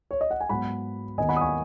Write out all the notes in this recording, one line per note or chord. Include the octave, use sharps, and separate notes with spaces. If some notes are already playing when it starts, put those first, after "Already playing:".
C#5
D#5
F#5
G#5
G#2 F#3 B3 F#5 B5
D#2 D#3 B3 D#5 G#5
F#5 B5
D#6
G#5 C#6